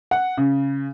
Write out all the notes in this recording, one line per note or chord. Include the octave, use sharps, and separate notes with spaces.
F#5
C#3